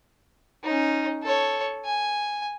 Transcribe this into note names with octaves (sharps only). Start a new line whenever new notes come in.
C#4 D#4
A4 C#5
G#5